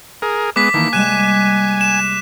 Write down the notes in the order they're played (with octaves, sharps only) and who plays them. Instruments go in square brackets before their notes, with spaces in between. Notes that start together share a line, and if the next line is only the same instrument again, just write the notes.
[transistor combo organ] G#4 A#4
[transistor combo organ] G#3 B3 [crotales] D6 B6
[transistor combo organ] D#3 E3 [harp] A#3 A5
[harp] C3 G3 G#3 [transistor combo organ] G#5 [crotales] F#6 D#7 E7
[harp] A#6
[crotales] E7